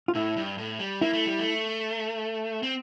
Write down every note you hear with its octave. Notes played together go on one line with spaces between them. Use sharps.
F4
A2 E4
G2
A2
G3
A#3 E4
A3
G3
A3
C4